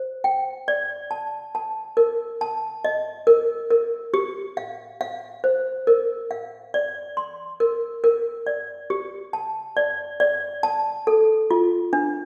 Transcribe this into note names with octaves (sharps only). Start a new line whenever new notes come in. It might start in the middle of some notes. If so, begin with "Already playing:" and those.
Already playing: C5
G5
D5
A5
A5
A#4
A5
D#5
A#4
A#4
G4
F5
F5
C5
A#4
F5
D5
C6
A#4
A#4
D5
G4
A5
D5
D5
A5
A4
F4
D4